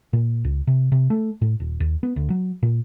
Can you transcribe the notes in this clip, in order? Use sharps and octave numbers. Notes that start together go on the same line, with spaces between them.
A#2
C#2
C3
C3
A3
A2
D#1
D#2
B3
D2
F#3
A#2